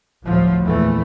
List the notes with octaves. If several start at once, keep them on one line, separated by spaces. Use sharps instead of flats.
G1 D2 A2 F3 F#3
E2 A#2 E3 A3